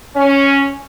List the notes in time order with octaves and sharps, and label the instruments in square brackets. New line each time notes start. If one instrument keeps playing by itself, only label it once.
[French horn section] C#4